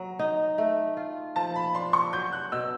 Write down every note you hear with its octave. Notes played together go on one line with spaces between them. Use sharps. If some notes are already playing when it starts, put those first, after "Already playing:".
Already playing: F#3 A#5
D#4
A3
F4
F3 A5
B5
D4 C6
C#6
F#3 G6
F#6
B2 E6